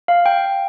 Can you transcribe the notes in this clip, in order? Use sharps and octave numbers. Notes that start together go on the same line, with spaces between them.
F5
G5